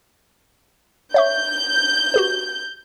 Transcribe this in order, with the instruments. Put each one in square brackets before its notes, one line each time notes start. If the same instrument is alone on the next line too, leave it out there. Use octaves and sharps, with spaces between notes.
[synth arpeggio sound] C#5 E5 C#6 [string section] G6
[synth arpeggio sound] F#4 G4 B4